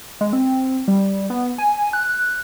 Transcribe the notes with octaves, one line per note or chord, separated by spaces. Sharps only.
G#3
C4
G3
B3
G#5
F#6